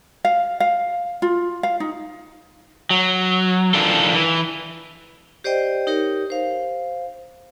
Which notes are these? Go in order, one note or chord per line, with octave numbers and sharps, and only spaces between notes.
F5
F5
F4
F5
D#4
F#3
D#3 E3 D4 F4 A4
E3
G4 C5 D5 D#5 G5
D#4 G4 A#4 C#5
C5 F5